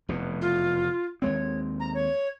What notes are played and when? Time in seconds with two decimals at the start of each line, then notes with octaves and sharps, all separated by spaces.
0.09 F1 E2 B2
0.42 F4
1.22 D#2 G#3 C4 C#5
1.80 A#5
1.94 C#5